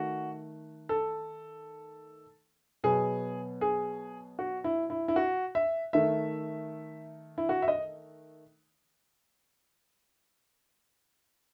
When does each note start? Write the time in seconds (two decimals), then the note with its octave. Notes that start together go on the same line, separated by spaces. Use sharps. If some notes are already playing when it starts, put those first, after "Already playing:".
Already playing: D#3 A3 F#4
0.89 A4
2.84 B2 F#3 B3 G#4
3.61 G#4
4.39 F#4
4.64 E4
4.90 E4
5.08 E4
5.16 F#4
5.55 E5
5.93 D#3 A3 E5
7.38 E4
7.49 F#4
7.62 E5
7.68 D#5